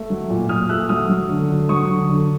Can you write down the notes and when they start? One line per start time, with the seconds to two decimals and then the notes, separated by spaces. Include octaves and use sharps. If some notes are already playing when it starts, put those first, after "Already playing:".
Already playing: A3
0.10 F#3
0.30 A#2
0.49 A#2 D#6 F6
0.69 A3 E6 F#6
0.89 F#3 D#6 F6
1.09 F#3
1.29 D3
1.50 D3
1.69 F#3 C#6 D#6
1.90 D3
2.09 D3